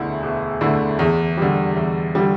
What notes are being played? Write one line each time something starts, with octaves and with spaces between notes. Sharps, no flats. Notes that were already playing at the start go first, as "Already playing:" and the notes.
Already playing: E1 D2 D3 A3 E4
E1
D2 D3 A3 E4
E2
D3 G3
E2
D3 G3